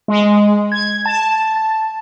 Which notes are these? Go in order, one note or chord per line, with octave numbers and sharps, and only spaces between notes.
G#3
G#6
A5